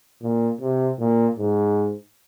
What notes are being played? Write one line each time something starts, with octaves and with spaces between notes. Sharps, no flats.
A#2
C3
A#2
G#2